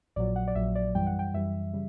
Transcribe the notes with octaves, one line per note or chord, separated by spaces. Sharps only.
A#1 A#2 F#3 D5
F#5
D5
A#1 A#2 F#3 E5
D5
F#2 E3 G3 G5
F#5
G5
F#2 E3 G3 E5
C#3 G3